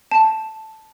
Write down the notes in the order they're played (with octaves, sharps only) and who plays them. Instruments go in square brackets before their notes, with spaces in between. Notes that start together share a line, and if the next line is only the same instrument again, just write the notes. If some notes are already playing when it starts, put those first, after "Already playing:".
[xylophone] A5